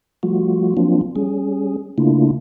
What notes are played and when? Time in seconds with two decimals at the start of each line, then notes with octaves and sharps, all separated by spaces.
0.23 F3 G3 A3 F4 F#4
0.77 F3 F#3 A#3 C4 D4 F4
1.16 G3 C#4 G#4
1.98 C#3 A3 A#3 D4 E4 F4